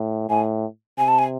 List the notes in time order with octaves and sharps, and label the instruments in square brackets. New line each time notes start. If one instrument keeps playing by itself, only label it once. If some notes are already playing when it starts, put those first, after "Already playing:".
Already playing: [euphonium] A2
[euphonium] A2 [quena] G#5
[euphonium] C3 [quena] G#5
[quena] A5
G#5